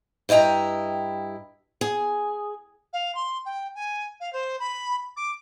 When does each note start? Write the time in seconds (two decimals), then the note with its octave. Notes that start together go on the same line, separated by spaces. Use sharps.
0.29 G2 E4 D#5 G5 A#5
1.81 G#4
2.93 F5
3.15 C6
3.45 G5
3.75 G#5
4.20 F5
4.33 C5
4.59 B5
5.16 D6